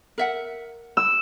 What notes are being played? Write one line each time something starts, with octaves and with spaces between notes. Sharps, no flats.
A#4 E5 F#5
E6